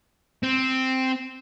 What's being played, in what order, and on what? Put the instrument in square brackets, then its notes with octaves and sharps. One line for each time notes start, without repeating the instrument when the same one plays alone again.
[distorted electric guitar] C4